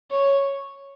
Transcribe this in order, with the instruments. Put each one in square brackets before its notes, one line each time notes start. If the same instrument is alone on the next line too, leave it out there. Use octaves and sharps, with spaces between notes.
[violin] C#5